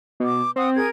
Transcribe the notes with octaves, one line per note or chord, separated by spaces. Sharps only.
B2 D6
C4 F#5 D#6
G#4 A#4 G#6